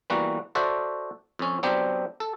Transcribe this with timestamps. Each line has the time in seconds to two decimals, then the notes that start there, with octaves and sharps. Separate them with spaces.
0.10 E3 G3 A#3 B3 F#4
0.55 F#4 A4 C5 D5 E5 F#5
1.39 F2 C#4
1.63 F#3 B3 C4 D4 G4
2.20 A4